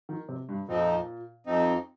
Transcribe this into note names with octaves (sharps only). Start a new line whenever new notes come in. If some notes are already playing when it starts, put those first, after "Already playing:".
D#3
C3
G2
F2 A#2 F3 C4 D#4
F2 F3 C4 D#4